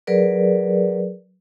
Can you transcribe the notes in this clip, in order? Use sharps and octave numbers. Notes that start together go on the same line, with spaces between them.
F#3 G#4 A#4 B4 D5